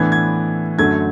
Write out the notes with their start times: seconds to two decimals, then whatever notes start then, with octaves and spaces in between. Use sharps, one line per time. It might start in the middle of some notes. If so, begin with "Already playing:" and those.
Already playing: A2 E3 B3 D4 G#6
0.12 G#6
0.78 F#2 D3 F#3 A3 G#6